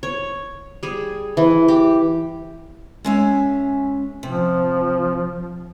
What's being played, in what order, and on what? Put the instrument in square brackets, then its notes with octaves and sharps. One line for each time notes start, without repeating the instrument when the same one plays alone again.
[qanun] C#5
G3 G#4
E3
G4
[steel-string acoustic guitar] G#3 C#4 E5
[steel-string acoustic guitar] C3 [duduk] F3